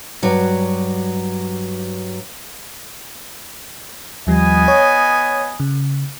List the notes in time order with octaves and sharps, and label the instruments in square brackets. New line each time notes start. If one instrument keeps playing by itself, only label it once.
[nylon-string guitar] G2 F#3 F#4
[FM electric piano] D#2 F3 G3 [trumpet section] B3 D#5 G#5
[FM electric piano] C#5
C#3